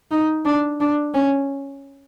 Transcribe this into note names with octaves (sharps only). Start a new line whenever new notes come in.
D#4
D4
D4
C#4